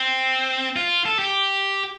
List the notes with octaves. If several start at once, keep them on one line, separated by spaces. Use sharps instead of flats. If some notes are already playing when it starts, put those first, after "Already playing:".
Already playing: C4
F4
A4
G4